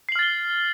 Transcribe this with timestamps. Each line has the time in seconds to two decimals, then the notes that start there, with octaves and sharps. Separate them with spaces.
0.09 C7
0.12 F#7
0.16 F6
0.19 A6
0.23 G7